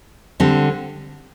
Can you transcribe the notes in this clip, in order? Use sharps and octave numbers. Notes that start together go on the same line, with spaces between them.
D3 G3 C4